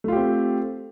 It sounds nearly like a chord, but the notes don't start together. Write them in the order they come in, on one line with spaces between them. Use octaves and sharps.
A3 F4 G4 C4